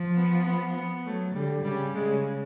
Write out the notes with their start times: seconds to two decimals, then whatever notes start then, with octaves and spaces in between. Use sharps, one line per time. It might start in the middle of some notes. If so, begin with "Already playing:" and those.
Already playing: F3
0.17 B3
0.46 B3
0.75 B3
1.06 F#3 A3
1.35 D3 G3
1.65 C#3 G3
1.95 C#3 G#3